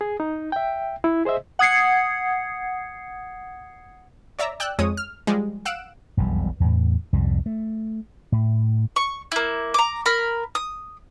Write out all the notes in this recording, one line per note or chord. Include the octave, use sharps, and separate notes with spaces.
G#4
D#4
E5 G5
E4
G#4 C5 D#5 E5
F#5 D#6 G#6 C7 C#7
C#5 D5 E5 A#5
D5 G5 E6 F#6
F2 G#3 C#5 D#6
F6
F3 G3 G#3
F5 F#5 E6 F#6 D7 E7
E1 B1 F2 G3
E2 A2
C2 F2 G#2 G3
A3
A2
C#6
A#3 E4
A#5 D6
A#4 B5
D#6